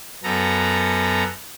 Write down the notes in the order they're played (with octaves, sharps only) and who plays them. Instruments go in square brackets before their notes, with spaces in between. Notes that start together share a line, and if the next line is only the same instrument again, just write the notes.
[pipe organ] F#2 B3 A4 A#5